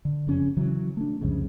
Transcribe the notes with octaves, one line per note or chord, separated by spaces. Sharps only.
D3
F#1 F2 C#3 C#4
C#3 E3 F#3
A3 D4
C2 F2 G#2 C#3